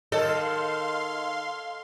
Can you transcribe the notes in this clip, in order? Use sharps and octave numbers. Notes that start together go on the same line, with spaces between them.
D#3 A4 C#5 D#5 F5 C6